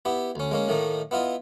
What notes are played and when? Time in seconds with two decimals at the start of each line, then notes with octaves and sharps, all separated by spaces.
0.05 B3 E4 G4
0.35 D2 C#4
0.51 G#3 A#3 C#4
0.68 A2 D#3 A3 A#3 D#4
1.11 B3 E4 F4 D#5